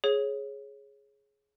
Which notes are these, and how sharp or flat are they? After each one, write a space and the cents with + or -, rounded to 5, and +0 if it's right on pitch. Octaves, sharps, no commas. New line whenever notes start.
G#4 +10 C#5 -15